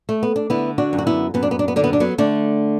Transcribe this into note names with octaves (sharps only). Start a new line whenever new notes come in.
A3
B3
D4
D3 B3 E4
D4 F#4
F#2
F#4
B3 E4
F#2 B3
D4
B3
D4
B3
D3 D4
B3
D4
F#3 B3
D3 A3 D4